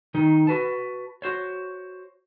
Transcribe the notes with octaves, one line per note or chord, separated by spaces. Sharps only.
D#3 D#4
F#4 B4 A5
F#4 C5 C#5